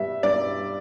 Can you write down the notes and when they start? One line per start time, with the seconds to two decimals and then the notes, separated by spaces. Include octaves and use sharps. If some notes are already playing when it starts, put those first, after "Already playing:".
Already playing: G2 G3 E5
0.23 G2 D5